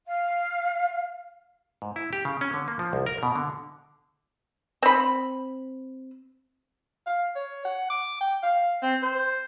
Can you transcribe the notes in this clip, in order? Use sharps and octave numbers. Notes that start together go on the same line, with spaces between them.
F5
G#2
E4
G4
C#3
C#4
D3
A#3
F3
C2
A#4
B2
D3
C4 B5
F5
C#5
F#5
D6
G5
F5
C4
C5